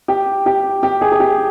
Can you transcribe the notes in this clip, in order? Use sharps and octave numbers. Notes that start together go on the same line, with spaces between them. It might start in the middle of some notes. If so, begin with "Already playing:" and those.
G4
G4
G4
G#4
G#4
G4